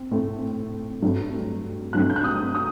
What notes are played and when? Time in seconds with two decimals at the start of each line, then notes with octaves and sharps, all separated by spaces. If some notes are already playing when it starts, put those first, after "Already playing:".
Already playing: C4
0.11 A2 A3 C4
1.02 G2 F#3 A3 C4
1.93 G2 F#3 A3 C4 F#6
2.10 G6
2.16 F#6
2.24 D#6
2.55 D#6